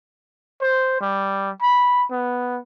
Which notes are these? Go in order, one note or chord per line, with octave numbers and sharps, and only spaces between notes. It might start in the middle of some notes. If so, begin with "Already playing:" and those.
C5
G3
B5
B3